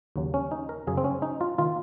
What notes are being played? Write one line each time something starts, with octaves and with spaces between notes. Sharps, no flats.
D#2 C#3 F#3 A#3
C#4
D#4
A#4
F#2 C#3 F#3 G#4
C4
C#4
D#4
F4
D#3 A#3 F4